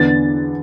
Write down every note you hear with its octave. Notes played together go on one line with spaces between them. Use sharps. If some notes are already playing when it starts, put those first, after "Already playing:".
Already playing: E2 D3 B3 D4 A6